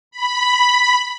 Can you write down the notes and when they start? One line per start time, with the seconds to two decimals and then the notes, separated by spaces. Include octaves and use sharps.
0.11 B5